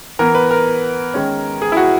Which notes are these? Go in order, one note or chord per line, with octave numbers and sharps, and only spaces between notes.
E3 B3 A#4
B4
A#4
D#3 G#3 C#4
G#4
E4
F#4